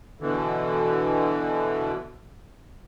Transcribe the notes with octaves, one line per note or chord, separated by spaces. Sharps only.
B2 D3 E3